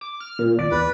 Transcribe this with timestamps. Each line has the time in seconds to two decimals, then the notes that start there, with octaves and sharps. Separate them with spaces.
0.01 D6
0.20 F6
0.39 A#2
0.59 G#1 D5
0.71 E2 B4